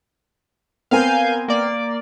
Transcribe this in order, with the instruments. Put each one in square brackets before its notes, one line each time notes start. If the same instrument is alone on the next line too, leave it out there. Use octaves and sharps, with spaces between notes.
[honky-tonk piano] B3 C4 A#4 [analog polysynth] F5 G#5 G6
[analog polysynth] A#3 D5